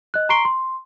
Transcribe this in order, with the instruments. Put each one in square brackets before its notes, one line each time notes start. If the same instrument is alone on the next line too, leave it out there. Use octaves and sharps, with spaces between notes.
[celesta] D#5 F#6
A#5 C6 C#6 C7 D7 G7
C6